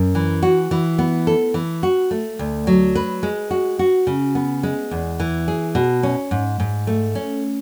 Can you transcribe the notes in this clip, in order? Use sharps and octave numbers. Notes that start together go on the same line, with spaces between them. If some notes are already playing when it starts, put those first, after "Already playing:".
Already playing: F#2
E3
F#4
E3
B3
A4
E3
F#4
A3
D2
F#3
B4
G#3
F#4
F#4
C#3
B3
G#3
E2
E3
G#4
B2
C#4
G#2
G#2
A3
C#4